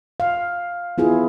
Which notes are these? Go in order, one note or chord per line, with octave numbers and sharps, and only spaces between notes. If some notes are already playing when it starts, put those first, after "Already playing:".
F5
B3 E4 F4 G#4